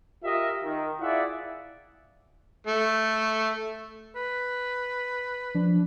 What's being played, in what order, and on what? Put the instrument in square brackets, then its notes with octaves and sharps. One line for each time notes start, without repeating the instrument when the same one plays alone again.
[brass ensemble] F4 G4 A#4 D#5 E5
D#3
E4 F4 G#4 D5 E5 F#5
[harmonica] A3
[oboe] B4
[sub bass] F3 [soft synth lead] D4